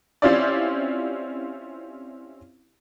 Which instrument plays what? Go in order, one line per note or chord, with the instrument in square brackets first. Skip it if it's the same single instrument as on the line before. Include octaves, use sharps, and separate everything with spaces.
[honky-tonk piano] C4 C#4 E4 F4 G4 D5